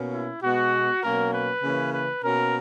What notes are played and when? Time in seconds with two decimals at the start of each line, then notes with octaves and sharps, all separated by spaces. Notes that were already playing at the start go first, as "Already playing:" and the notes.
Already playing: B2 A#3 C#4
0.13 E4
0.43 B2 G#3 B3 F#4
1.03 B2 F#3 A#3 C#4 A#4
1.33 B4
1.63 C#3 E3 A#3 C#4
1.93 B4
2.23 B2 A#3 C#4 A#4